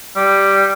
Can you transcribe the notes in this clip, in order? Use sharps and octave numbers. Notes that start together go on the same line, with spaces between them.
G3